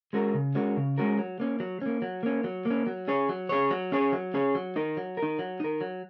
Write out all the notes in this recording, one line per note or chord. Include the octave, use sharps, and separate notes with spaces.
G#3 C#4 F#4 A#4
C#3
G#3 C#4 F#4 A#4
C#3
G#3 C#4 F#4 A#4
F#3
A#3 C#4
F#3
A#3 C#4
F#3
A#3 C#4
F#3
A#3
C#4
F#3
C#4 G#4 C#5
F#3
C#4 G#4 C#5
F#3
C#4 G#4 C#5
F#3
C#4 G#4 C#5
F#3
D#4 A#4
F#3
A#4
D#4
F#3
D#4 A#4
F#3